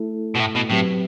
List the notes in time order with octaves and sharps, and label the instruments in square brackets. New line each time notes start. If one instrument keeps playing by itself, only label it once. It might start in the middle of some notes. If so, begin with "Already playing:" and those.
Already playing: [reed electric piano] A3 E4 A4
[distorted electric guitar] B2
A2
B2
[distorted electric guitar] A2 [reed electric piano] F#3 C4 G4 B4